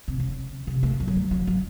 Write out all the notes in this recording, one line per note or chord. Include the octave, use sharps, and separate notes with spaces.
C3
C#3
C3
A3
F3
F#3
A3
F#3
F#3